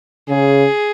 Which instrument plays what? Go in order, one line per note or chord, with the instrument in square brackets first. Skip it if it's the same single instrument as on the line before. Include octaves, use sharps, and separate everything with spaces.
[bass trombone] C#3 [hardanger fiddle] G#4